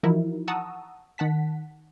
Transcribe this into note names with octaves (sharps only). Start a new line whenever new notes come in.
E3 F3 D#4 E4 F#4 A#4
F#5 A5 A#5 C#6 D#6 E6
D#3 F#5 A5 B6